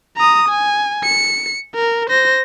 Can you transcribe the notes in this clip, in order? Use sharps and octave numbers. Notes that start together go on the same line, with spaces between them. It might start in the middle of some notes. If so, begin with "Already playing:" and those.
A#5 D#6
G#5
C#7
A#4
C5 A#6